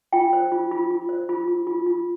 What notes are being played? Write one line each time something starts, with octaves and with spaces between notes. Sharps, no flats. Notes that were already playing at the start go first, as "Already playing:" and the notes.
F4 G5
C5
F4
F4
F4
C5
F4
F4
F4
F4